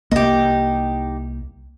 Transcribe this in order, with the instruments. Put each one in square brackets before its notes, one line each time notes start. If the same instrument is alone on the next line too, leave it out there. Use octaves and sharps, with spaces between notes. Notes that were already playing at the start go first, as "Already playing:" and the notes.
[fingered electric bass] C2 A#3 [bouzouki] D#4 G4